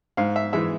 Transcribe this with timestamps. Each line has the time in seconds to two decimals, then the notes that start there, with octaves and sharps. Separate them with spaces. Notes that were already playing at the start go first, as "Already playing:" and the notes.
0.17 G#2 F5
0.36 E5
0.53 E3 G#3 E5